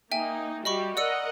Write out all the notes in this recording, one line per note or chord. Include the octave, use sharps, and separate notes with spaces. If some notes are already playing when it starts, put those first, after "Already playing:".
A#3 D#4 E5 G5 G#5
G3 F#4 G4 D#5 B5 C#6
A#4 D5 D#5 F#5 E6 C#7